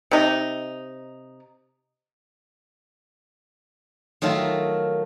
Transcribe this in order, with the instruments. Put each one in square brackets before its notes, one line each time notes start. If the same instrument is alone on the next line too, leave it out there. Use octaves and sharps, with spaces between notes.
[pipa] C3 D#4
[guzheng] D#3 F#3 A3 F4